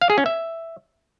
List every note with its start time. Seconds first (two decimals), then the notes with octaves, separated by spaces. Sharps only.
0.02 F5
0.10 G#4
0.18 C#4
0.26 E5